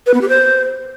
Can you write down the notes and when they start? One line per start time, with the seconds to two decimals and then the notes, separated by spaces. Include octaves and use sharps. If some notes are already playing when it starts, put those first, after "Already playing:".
0.06 B4
0.14 B3
0.21 G4
0.29 C5